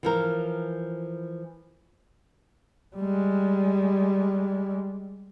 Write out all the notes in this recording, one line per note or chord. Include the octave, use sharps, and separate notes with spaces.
E3 F3 A#4
G3 G#3